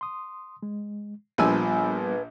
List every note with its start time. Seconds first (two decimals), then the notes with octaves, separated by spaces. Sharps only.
0.01 C6 D#6
0.63 G#3
1.38 A#1 F3 G3 B3 D4 B4 G#5 E6